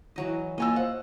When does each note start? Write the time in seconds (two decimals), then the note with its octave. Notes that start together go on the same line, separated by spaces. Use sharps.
0.16 E3 F#3 D#5
0.58 A#3 F4 C#5 D#5 G#5 E6
0.76 C5 F5 F#5